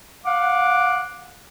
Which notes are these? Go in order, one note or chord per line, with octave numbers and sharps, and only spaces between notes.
F5 F#5 D6